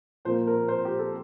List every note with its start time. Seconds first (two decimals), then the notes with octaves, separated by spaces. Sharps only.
0.25 A#2 F3 A#3 C5
0.47 A#4
0.68 C5
0.85 G4
0.99 A4